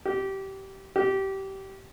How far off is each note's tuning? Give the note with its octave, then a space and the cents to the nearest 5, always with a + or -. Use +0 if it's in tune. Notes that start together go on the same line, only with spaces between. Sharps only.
G4 -20
G4 -20